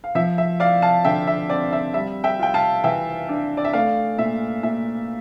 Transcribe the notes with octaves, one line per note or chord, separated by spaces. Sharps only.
F5
F3 E5
E5
E4 D5 F5
F5 A5
D3 E5 G5
E5
C4 D5
E5
G3 E5
E5 G5
F4 G5
F5 A5
E3 E5 G5
D4
D5
E5
A3 D5 F5
A#2 E5
A#2 E5